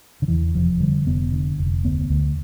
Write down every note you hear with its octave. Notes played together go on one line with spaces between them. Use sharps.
D3
E2 E3
F1 F3
D3 G3
F1 B3
D3
F1
D2 B3
D2